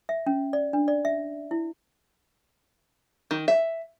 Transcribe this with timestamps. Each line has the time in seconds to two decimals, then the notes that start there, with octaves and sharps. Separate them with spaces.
0.09 E5
0.27 C#4
0.53 D5
0.73 D4
0.88 D5
1.05 E5
1.51 E4
3.31 D#3
3.48 E5